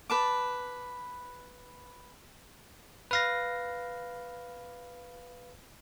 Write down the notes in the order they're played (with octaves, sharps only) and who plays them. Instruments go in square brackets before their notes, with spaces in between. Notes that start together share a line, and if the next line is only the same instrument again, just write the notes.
[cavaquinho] B4 A5 D6
[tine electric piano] B4 F5 A#6